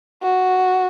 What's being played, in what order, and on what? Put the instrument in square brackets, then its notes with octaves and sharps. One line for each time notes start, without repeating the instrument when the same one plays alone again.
[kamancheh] F#4